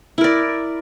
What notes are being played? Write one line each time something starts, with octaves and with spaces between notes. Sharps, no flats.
E4 A#4 D5